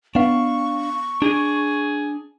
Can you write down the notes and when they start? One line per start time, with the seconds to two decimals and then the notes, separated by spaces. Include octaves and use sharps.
0.15 B3 D4 F5 C#6
1.22 D4 G#4